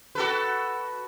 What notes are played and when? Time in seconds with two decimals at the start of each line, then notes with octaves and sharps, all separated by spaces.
0.15 F#4 A4 B4